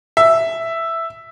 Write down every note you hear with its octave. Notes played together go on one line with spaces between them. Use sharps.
E5